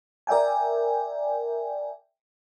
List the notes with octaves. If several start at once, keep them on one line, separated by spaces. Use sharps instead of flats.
A#4 D5 E5 G5 G#5